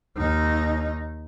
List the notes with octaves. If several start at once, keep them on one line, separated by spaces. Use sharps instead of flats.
D#2 D#4